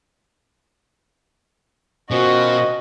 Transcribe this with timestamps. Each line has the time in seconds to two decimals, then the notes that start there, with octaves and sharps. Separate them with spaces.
2.11 B2 D#3 F3 C#4 F#4 D#5